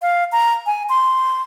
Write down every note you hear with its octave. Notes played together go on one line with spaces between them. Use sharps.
F5
A#5
G#5
C6